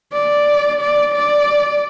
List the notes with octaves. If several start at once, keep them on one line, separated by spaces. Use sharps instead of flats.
D5
D5
D5